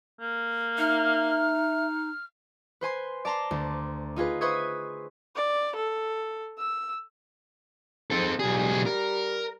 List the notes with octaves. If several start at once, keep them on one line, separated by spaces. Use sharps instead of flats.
A#3
D#4 E5 F6
B4 C5 G#5 C6
D5 A5 A#5 C6
D2
D#4 F4 G#4 B4
B4 C5 E5 C#6 D#6 G#6
D5
A4
E6
G#2 C4 A4
B1 G3 G#4
A#4